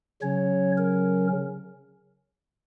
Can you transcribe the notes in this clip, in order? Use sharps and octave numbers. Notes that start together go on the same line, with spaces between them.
C#3 F#3 C#4 C#5
A#4